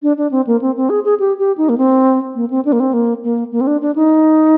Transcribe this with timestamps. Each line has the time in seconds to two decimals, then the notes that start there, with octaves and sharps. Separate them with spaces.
0.03 D4
0.17 D4
0.31 C4
0.47 A#3
0.61 C4
0.76 C4
0.90 G#4
1.04 G#4
1.20 G4
1.39 G4
1.58 D#4
1.69 A#3
1.78 C4
2.35 A#3
2.50 C4
2.65 D4
2.72 A#3
2.80 C4
2.93 A#3
3.24 A#3
3.52 A#3
3.61 C4
3.67 D4
3.81 D4
3.96 D#4